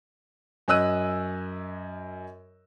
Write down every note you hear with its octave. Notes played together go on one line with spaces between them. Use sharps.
F#2 C#4 D#5 E6 F#6 D#7